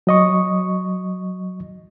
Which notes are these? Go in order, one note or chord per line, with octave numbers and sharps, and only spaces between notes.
F#3 D#5 C#6